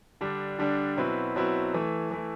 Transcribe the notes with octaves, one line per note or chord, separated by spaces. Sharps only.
D3 G3 D4
D3 G3 D4
B2 F#3 C4 E4 B4
B2 F#3 C4 E4 B4
E3 A3 E4
E3 A3 E4